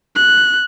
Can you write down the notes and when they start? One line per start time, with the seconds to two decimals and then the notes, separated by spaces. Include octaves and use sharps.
0.16 F#6